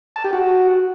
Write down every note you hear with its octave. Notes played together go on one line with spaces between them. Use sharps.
A5
G4
F#4